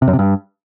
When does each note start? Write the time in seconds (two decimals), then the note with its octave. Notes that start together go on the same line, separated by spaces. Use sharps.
0.02 C3
0.08 F#2
0.13 C3
0.19 G2